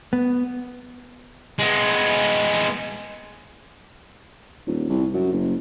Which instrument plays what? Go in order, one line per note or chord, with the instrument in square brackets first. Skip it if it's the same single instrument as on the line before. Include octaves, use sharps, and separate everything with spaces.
[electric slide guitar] B3
[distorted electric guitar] G#3 B3
[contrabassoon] D#1
C2
F#2
F#1